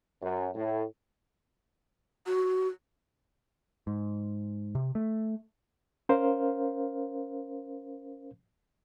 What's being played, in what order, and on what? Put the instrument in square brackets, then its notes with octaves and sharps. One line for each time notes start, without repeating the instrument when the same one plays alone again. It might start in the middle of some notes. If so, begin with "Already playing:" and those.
[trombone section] F#2
A2
[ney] F#4
[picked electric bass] G#2
C3
A3
[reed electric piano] C#4 A#4 C5 F5